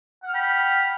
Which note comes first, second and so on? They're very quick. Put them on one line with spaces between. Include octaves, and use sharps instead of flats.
F#5 F6 G5 B5